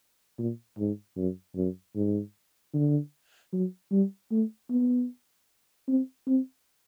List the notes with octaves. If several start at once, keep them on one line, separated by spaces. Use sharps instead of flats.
A#2
G#2
F#2
F#2
G#2
D3
F#3
G3
A3
B3
C4
C4